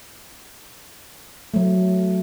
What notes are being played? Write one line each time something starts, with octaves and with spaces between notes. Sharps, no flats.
F#3 A3